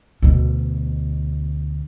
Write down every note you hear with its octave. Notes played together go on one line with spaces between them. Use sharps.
D2 B2